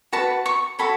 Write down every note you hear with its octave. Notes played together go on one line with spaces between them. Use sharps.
F#4 B4 A5
C#6
F#4 A4 C#5 B5